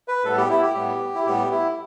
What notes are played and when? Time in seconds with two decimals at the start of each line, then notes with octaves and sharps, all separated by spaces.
0.08 B4
0.24 A2 G3 B3 A4
0.37 G4
0.50 E4
0.63 G4
0.75 A2 G3 B3
1.15 E4
1.26 A2 G3 B3 G4
1.51 E4